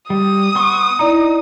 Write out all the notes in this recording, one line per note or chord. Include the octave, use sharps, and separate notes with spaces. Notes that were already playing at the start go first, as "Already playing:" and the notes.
G3 D#6
B3 C6 C#6
D#4 E4 D5 A#5